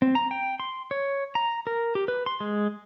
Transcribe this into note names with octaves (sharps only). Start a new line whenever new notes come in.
C4
A#5
G5
C6
C#5
A#5
A#4
G4
B4
C6
G#3